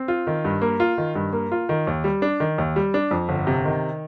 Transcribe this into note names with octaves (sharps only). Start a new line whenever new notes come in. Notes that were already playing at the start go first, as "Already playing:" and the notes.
Already playing: C4
F4
D#3
G2
A#3
F4
D#3
G2
A#3
F4
D#3
D#2
G3
D4
D#3
D#2
G3
D4
F2
G1
C3
D#3